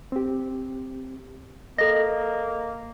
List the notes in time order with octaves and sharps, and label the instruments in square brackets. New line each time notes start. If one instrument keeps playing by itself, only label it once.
[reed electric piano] C4 G4
[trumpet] A#3 [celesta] A4 A#6 [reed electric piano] D#5